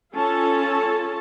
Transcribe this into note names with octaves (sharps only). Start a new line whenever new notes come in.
C#4 F4 A4 A5